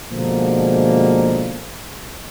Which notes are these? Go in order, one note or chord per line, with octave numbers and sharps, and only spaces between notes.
B2 D3 F3 G#3 A#3